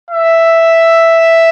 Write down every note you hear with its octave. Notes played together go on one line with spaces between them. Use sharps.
E5